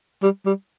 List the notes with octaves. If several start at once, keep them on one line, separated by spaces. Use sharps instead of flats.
G3
G3